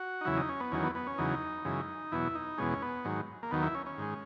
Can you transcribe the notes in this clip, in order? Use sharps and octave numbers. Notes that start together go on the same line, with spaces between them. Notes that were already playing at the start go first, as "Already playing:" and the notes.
Already playing: F#4
D#4
E2 C#3 F#3 E4
D#4
C#4
B3
E2 D#3 F#3 C#4
B3
B3
C#4
E2 C#3 F#3 D#4
F#2 C#3 E3 G#3
E2 B2 F#3 E4
D#4
E2 B2 G#3 C#4
B3
G#2 D#3 F#3
A#3
D#2 D#3 F#3 B3
E4
C#4
C#4
G#2 D#3 G#3